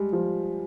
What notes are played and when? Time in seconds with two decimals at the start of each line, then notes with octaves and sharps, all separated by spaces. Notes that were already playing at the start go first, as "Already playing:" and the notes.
Already playing: G3 G#3
0.13 F3